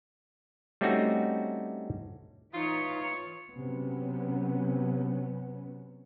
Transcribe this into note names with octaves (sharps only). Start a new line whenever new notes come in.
G3 A3 C4 C#4 D#4 F#4
E3 D#4 F4 C#5
C3 F#3 B3 C#4